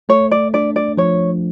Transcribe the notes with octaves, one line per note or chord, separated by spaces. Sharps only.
A3 C#5
D5
D4 D5
D5
F3 C#5